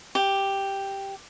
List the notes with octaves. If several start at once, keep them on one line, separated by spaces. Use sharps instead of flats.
G4